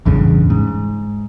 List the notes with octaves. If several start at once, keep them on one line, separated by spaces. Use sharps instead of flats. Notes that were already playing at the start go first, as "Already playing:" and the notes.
A1 E2 G2 C#3
G#2